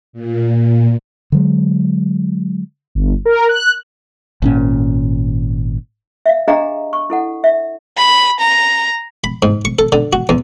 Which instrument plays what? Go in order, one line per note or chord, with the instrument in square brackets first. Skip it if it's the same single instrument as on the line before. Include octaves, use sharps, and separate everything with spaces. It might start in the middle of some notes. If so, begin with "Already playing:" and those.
[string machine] A#2
[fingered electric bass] D3 F#3 G#3
[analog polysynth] G1
A#4
F#6
[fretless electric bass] G#1 A#2 C#4
[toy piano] E5 F5
D4 G4 G#4 D#5 F5 A#5
C#6
E4 A4 F#5
E5
[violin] B5
A#5
[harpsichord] B5
G#2
C#6
A4
D3
F#4
E2